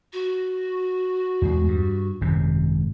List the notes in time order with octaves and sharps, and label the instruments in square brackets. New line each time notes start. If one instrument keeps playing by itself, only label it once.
[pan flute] F#4
[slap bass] E2 G#3
G2
G#1 F#2 C3